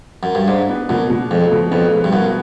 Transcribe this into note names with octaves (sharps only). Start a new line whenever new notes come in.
F#2
G2
G#2 D4
B3
F#2 B2
B2
F2 G#3
B2
F2 B3
G#3
G2
F#2 B3